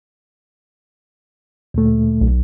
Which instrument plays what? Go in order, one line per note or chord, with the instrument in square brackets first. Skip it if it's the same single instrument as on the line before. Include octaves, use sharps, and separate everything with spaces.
[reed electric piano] D2 A#2 A3
[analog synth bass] B1